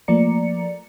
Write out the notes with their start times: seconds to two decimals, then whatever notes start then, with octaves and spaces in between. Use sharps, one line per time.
0.08 F3 A3 A#3 D5 A#5 C#7